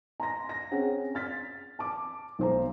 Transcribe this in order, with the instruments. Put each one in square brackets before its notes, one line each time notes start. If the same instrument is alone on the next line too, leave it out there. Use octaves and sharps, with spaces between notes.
[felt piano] A#5 C6 A#6
A#6
C4 C#4 G#4 F#5
F6 A6 B6
A5 D6
B1 C5 A#5